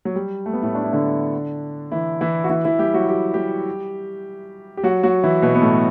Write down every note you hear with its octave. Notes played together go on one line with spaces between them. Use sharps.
F#3
G3
A3
B3
A2 A3
D4
E4
D3 D4
E3 E4
E3 E4
F#4
E3 E4
E3 E4
G3 G4
F#3 F#4
G4
G3 G4
G4
F#3 F#4
F#3 F#4
E3 E4
B2 B3
B3
A2 A3